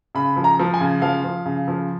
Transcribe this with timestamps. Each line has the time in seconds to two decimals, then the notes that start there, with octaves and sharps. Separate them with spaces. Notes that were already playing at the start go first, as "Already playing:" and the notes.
0.15 C#3 B5
0.36 F3
0.44 A#5
0.59 F3
0.74 G#5
0.80 C#3
1.02 F3 F5
1.24 F3
1.46 C#3
1.68 F3